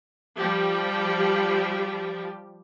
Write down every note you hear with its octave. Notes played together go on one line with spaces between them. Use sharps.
F3 G3 G4